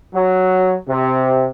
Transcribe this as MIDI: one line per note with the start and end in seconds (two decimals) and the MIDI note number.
0.14 0.75 54
0.88 1.48 48